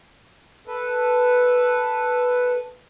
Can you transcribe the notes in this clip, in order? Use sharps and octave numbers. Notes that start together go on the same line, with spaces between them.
A4 B4